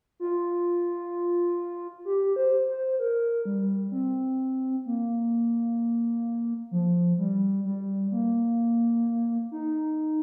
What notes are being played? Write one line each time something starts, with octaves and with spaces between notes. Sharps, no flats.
F4
G4
C5
C5
A#4
G3
C4
A#3
F3
G3
G3
A#3
D#4